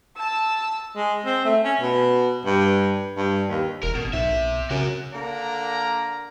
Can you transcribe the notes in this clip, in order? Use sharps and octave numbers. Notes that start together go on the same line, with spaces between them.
A5 E6
G#3
C4
A3
C#4
B2
G2
G2
D#2
E1 A#4
A1 B2
B1 C3 E5
C#3 F#4 A#4
D3 A#3 D5 A#5